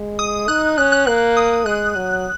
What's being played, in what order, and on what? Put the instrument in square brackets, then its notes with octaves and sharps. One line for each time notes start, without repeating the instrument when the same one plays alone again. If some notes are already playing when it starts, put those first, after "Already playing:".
Already playing: [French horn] G#3
[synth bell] D#6
[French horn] D#4 [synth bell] F#6
[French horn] C#4 [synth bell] F#6
[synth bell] F#6
[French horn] A#3 [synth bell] F#6
[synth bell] D#6
[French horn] G#3 [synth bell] F#6
[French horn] F#3